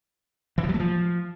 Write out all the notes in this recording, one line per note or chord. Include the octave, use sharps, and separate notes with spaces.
E3
F3
F#3
A3
F3